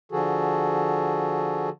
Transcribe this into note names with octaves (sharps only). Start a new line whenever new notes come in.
D3 F3 F#4 G#4 A4